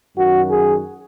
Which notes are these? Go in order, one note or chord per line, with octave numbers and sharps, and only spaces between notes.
F#2 D#3 F#3 F#4
G#4